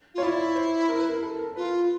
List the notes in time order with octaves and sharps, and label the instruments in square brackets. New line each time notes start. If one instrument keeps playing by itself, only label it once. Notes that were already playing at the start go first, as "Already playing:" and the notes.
[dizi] F4
[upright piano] C#5
[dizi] E4 [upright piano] D5
[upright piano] C5
A#4
B4
A#4
A4
A#4
[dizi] F4 [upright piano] B4